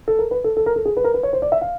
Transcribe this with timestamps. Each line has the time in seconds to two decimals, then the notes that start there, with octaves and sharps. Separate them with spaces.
0.08 A4
0.19 A#4
0.31 B4
0.44 A4
0.57 A4
0.66 A#4
0.76 A4
0.85 G#4
0.97 B4
1.04 A#4
1.14 B4
1.23 C#5
1.33 C5
1.42 D5
1.52 E5
1.61 F5